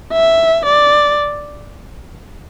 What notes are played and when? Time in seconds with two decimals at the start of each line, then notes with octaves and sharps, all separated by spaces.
0.14 E5
0.66 D5